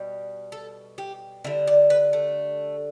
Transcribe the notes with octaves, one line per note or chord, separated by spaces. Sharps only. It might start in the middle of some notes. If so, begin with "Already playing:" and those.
Already playing: B2 G3
A4
G4
D3 G3 E4
D5
B4
A3